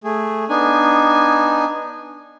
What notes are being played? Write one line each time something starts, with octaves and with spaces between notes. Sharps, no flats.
A3 G#4
B3 D4 D#4 G#5